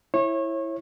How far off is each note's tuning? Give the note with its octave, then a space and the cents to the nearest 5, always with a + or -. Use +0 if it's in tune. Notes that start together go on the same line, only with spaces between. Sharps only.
E4 +0 C#5 -30